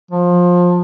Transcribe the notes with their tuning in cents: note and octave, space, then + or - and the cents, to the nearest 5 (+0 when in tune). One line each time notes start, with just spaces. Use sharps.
F3 +20